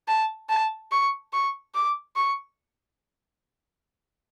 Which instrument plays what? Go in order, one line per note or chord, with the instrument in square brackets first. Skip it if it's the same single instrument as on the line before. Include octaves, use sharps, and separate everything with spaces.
[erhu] A5
A5
C#6
C#6
D6
C#6